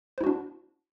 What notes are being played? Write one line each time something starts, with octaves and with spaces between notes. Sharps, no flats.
D4 E4 F#4 C5